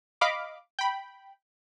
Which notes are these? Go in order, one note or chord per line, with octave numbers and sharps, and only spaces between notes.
D#5 F5 B5 D6
G5 B5